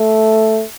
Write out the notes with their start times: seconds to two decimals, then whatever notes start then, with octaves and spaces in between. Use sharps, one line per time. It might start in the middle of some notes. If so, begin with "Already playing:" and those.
Already playing: A3